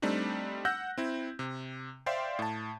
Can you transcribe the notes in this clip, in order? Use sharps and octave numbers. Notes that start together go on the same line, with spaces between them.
G3 A3 C4 D4 D#4
F#5 E6 F#6 G6 A#6
C4 E4
C3
C5 D5 E5 F5 G5 C6
A2 A5